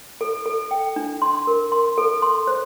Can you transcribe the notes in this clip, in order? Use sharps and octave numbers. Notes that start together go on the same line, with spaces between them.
A4
A4
G5
D4
C6
A#4
C6
A4
C6
C5